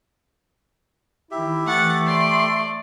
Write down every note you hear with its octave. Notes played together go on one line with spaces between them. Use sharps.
D#3 E4 G4 E5
E3 A3 F#5 A6
D5 C6